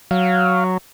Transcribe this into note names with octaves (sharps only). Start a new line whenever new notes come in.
F#3 F5